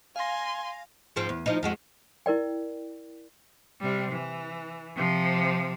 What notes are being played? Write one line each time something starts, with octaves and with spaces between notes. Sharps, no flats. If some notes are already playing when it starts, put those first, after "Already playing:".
F5 G#5 C6 A#6
G#2 F3 C4
E2
F3 D#4
F2 G#3 F#4
E4 A#4 D5 G5
C3 G3
E3
C3 F3